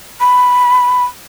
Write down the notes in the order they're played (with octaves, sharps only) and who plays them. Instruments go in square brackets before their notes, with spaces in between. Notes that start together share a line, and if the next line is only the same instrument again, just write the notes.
[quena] B5